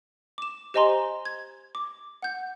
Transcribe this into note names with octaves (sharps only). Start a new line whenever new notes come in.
D6 E7
G4 C5 D#5 G#5 A#5 C6
G#6
D6
F#5 G6